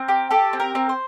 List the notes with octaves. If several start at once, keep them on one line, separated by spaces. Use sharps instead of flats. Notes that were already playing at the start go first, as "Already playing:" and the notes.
Already playing: C4 A#4
G4
G4 A4
C4
A#4
C4
C5